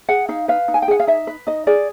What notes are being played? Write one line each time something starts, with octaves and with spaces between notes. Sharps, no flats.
G#4 F#5
D#4 F5
B4 F5
D#4
G#5
G5
G#4 F#5
F5
D#4 E5
B4
D#4 D#5
G#4 D5